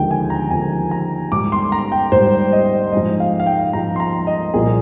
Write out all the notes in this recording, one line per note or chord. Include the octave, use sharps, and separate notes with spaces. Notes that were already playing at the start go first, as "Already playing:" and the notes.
Already playing: D#2 D3 F3 G#3 G5
G#5
A#5
D#2 D3 F3 G#3 G#5
A#5
G#2 G3 D6
C6
A#5
G5
G#2 G3 C5
D#5
G#2 F3 G#3 D#5
F5
F5
G5
G#2 F3 G#3 A#5
C6
A#5
D#5
C2 A#2 F3 G#4